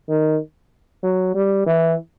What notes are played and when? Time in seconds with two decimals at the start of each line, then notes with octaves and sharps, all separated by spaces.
0.09 D#3
1.03 F#3
1.35 G3
1.66 E3